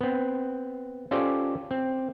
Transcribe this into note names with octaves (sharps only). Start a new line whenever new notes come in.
B3 C4
C#4 F4 G4 A4 C5 D5
C4